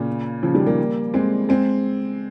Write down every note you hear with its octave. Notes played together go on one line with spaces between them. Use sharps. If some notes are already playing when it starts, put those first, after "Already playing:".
Already playing: A#2 C#3
C#3 F3
D#3 G3
G3 A#3
G#3 C4
G#3 C4